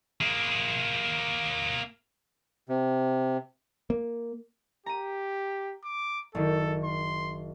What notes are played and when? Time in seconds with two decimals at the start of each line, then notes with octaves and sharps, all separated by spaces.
0.21 A#3 G#4
2.69 C3
3.90 A#3
4.86 G4 A#5 D#7
5.84 D6
6.35 F#1 D#3 A4
6.85 C6